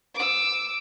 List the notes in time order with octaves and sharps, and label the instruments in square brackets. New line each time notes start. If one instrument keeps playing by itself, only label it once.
[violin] D6 E6